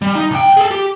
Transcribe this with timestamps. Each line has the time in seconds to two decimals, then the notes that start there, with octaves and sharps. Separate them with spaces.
0.02 G3
0.15 D#4
0.31 C2 G5
0.57 G#4 A4
0.71 G4